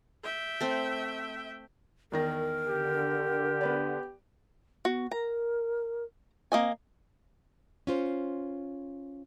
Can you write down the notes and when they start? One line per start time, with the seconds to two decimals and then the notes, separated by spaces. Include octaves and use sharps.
0.23 E5 G5
0.60 A3 C4
2.12 E2 D#3 A#4 A#6
2.67 D3 G4
3.61 B3 B4 D5
4.85 B3 F#4
5.11 A#4 A#5
6.52 A#3 C4 D#5 G#5
7.87 C#4 F4 C5